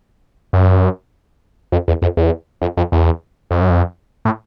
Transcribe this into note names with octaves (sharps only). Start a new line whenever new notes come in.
F#2
F2
E2
F2
E2
F2
F2
E2
F2
F#2
F2
A2